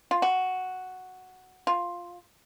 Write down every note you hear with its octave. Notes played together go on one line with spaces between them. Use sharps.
F4
F#4
F4